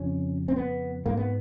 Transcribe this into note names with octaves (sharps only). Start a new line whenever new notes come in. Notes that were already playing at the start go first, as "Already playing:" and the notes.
Already playing: F2 C#3 C#4
C4
B3
G#2 A#3
B3